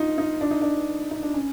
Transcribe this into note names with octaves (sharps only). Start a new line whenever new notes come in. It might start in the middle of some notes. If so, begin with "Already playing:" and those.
Already playing: D#4 F4
D#4
D4
D#4
D4
D#4
D4
C#4